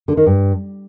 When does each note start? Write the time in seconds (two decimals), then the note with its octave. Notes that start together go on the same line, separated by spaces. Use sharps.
0.08 D3
0.17 D#3
0.26 G2